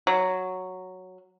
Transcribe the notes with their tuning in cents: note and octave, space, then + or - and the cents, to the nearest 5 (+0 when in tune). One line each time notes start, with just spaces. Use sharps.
F#3 +0